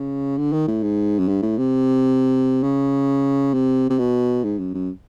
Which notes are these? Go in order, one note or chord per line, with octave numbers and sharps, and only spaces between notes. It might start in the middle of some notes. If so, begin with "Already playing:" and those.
Already playing: C#3
D3
D#3
A2
G#2
F#2
G2
A2
C3
C#3
C3
C3
B2
G#2
F#2
F#2